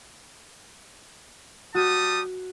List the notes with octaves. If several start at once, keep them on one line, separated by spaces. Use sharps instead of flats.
G3 F#4 A5 D#6